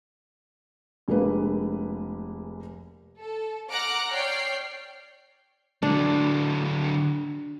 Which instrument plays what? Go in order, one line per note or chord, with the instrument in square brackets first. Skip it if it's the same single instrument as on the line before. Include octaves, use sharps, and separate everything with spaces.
[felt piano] F1 G#3 A#3 D4 B4
[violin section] A4
F#5 A#5 D6 F6 F#6 D7
C#5 D5 G5 F6 C7
[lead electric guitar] D3 F#3 [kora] D4